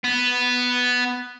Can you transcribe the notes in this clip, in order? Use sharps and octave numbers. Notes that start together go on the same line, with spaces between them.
B3